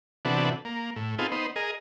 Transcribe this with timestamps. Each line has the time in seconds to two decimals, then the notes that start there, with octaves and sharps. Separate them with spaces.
0.25 C3 E3 B3 D4 F#4 A4
0.65 A#3
0.96 A2
1.18 B3 C4 D#4 F4 G#4 A4
1.32 B3 D#4 C5
1.56 G#4 A#4 D#5